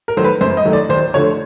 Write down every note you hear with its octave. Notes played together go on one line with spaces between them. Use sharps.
A#4
D#3 F#3 A3 C5
B4
F#2 C5
D#5
D#3 F#3 A3
D5
D#2 C5
D3 F3 A3 C#5